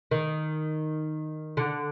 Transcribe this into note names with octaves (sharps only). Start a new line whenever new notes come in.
D#3
D3